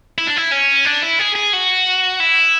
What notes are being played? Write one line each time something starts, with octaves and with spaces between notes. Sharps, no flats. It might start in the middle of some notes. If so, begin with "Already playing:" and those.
E4
D4
E4
C#4
D4
E4
G#4
G#4
F#4
E4